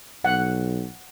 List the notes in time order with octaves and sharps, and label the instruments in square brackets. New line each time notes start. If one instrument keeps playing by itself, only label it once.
[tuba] B1 [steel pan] F#5